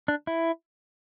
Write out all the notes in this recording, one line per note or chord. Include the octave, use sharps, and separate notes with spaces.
D4
E4